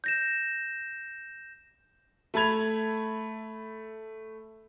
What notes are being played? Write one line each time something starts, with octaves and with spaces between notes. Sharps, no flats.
G6 A#6 E7
A3 A5 B5 G#6 F7